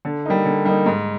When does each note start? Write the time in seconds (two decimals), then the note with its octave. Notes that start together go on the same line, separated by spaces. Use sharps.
0.05 D3
0.25 G3 A#3 D#4
0.45 D3
0.65 G3 A#3 D#4
0.86 G#2